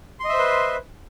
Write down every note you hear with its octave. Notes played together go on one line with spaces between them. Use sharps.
B4 C5 D#5 E5 C6